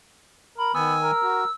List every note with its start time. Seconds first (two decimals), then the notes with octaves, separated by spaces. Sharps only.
0.58 A#4 B5
0.75 D#3 B3 G#5 E6
1.03 A#4
1.23 F#4